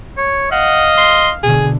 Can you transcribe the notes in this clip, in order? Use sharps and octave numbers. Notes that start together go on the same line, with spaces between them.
C#5
D#5 F5 F#5
C6
B2 D3 G#4